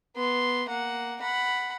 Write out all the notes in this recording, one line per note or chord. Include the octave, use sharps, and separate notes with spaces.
B3 C6
A#3 F#5
F#5 B5